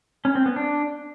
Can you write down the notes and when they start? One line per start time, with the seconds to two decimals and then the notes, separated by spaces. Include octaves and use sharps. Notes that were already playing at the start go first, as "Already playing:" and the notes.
0.25 C#4
0.35 C4
0.46 B3
0.56 D4